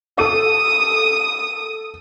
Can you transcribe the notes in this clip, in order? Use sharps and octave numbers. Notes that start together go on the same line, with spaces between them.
A4 D#6 D#7